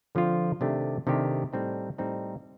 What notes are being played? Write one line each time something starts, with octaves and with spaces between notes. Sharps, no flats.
D3 F3 C4 F4
C3 D#3 A3 D4 G4
C3 D#3 A3 D4 G4
A2 G3 C4 D#4
A2 G3 C4 D#4